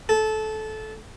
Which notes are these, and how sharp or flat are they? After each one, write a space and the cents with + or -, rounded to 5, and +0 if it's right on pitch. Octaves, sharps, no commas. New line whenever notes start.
A4 -20